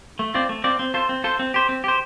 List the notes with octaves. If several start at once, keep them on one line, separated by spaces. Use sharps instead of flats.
A3
C4 F4 D5
A3
C4 F4 D5
C4
F4 A4 C5
C4
F4 A4 C5
C4
G4 C5
C4
G4 C5